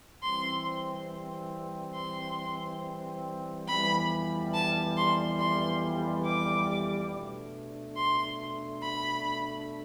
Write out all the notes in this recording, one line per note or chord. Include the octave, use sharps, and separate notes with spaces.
E3 G3 C4 C6
C6
F2 E3 G3 B3 B5
A5
C6
C6
D6
B2 A3 D4
C6
B5